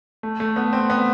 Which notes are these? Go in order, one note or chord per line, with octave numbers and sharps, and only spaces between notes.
A3
A3
B3
C4
B3